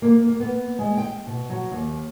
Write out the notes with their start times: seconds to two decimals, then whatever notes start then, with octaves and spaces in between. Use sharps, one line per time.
0.02 A#3
0.26 A#3
0.40 B3
0.79 G#3
0.98 G5
1.27 B2
1.50 F#3
1.72 D#2